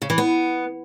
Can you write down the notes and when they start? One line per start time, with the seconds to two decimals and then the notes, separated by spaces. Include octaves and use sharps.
0.02 C#3
0.10 E3
0.18 B3